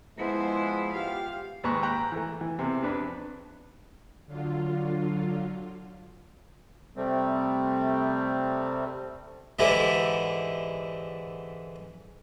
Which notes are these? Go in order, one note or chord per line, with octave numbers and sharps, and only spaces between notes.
F3 G#3 B3 E4 C5
F4 G4 F5
D#2 G#2 B4 A#5 C#6 F#6
G5 A#5 F#6
E3 A3
E3
E2 C3
F2 D4 B4
D3 F#3 F4
C3 G3 A3 C4
G#2 D3 E3 E4 G4